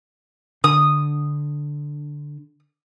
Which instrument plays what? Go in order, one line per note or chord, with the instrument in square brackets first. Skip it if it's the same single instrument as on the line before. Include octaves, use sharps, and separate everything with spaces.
[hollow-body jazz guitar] D3 [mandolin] D#6